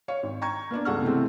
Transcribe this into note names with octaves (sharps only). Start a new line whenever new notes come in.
C#5 F5 C#6
G#1
G5 A#5 C#6 G#6
A#3 B3 D4 D5
G1 C#2 A4 F#5 C#6 F6
C3 E3 G#3 A3 C4